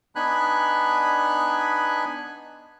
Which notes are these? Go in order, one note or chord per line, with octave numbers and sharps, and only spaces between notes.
B3 D4 D#4 G#5 B5 F#6